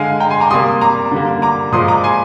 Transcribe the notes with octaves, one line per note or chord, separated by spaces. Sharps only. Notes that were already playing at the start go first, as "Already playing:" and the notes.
Already playing: D3 G#3 F5 G#5
G5 A#5
G#5 C6
A#5 D6
C3 G3 A#3 C6 D#6
A#5 D6
D3 G3 A#3
A#5 D6
A#2 F3 G#3 C6 D#6
A#5 D6
G#5 C6